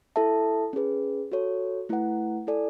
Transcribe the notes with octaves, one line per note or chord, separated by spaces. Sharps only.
E4 A4 E5 A5
C#4 G#4 B4
F#4 A4 C#5
A3 E4 B4 F#5
E4 A4 D5 G#5